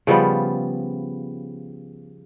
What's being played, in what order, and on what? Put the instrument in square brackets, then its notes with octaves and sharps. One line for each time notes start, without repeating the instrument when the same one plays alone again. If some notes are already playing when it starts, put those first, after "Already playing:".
[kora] C#3 F3 G3 B3